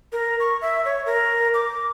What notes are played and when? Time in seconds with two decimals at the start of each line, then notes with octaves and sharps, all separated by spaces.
0.12 A#4
0.40 C#6
0.62 E5
0.85 C#5
1.06 A#4
1.54 D6